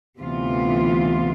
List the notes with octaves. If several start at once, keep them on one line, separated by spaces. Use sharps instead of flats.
D2 C3 E3 B3 F4